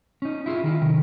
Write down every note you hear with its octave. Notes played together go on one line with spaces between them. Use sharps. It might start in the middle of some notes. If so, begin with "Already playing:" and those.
C#4 D#4
E4 F4 G#4
D#3 E4 F4
C3 D#3